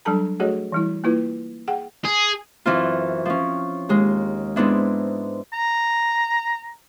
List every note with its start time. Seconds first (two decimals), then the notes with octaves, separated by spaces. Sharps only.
0.05 F#3 G3 D4 A4 A5 A#5
0.40 A3 F#4 G#4 A4 C#5 D#5
0.72 E3 G3 E4
1.04 A#3 E4 F4 B4
1.68 G#4 F#5 G5
2.05 G#4
2.66 F#2 E3 C4 F4
3.25 F3 C#4
3.89 D#2 G#3
4.56 G#2 B3 C4 D4 E4
5.53 A#5